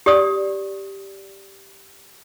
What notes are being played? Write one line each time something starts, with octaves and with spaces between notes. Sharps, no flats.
G4 D5 D#6